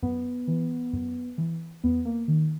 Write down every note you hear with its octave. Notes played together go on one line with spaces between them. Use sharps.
F#2 B3
E3
F#2
E3
E2 B3
A#3
D#3